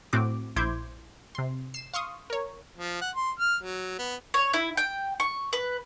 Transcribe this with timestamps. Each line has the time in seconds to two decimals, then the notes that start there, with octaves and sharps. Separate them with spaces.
0.13 A2 C4 F#4 D6
0.56 A#1 E4 C5 D6 G6 G#6
1.35 C3 C6
1.74 C7 E7
1.94 F5 C6 C#6 D#6
2.30 A#4 C#5
2.78 F3
3.02 F#5
3.15 C6
3.39 F6
3.63 F#3
3.99 B3
4.34 C#5
4.53 E4
4.77 G5
5.20 C#6
5.53 B4